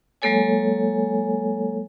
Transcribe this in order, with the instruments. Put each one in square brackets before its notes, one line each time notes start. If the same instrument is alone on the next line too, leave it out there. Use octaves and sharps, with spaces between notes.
[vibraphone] F#3 G#3 A#3 A4 C#5 G#5